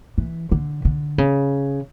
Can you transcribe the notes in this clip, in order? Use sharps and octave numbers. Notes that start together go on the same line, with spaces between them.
E3
D3
D3
C#3